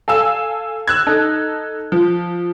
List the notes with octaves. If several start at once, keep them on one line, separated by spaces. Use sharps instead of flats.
A4 F5 G#5 E6
E6 F#6 G#6
D#4 A4
F3